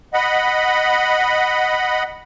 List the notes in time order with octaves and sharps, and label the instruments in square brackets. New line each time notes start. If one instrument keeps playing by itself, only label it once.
[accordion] D#5 F#5 B5